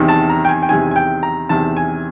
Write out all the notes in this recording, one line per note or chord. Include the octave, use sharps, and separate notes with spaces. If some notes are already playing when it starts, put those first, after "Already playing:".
Already playing: E2 C3 D#3
A5
A#5
G5
G#5
G5
E2 C3 D#3 G#5
G#5
G5
A#5
E2 C3 D#3 A5
G#5